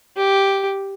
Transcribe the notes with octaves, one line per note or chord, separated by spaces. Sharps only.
G4